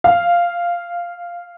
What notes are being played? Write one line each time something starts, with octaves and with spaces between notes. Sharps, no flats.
F5